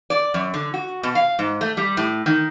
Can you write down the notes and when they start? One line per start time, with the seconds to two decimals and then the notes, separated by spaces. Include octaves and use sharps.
0.10 D5
0.34 F#2
0.54 D3
0.74 F#4
1.03 B2
1.15 F5
1.39 G#2
1.61 A3
1.77 G3
1.97 A2
2.26 D#3